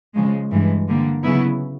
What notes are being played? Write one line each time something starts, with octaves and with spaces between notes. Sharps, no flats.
C#3 F3 G#3
G2 E3 G#3
D3 G3 A#3
C#3 F#3 B3 E4